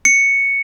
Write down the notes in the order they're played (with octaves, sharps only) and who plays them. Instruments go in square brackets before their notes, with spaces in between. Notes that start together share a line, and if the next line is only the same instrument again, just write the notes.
[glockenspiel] C#7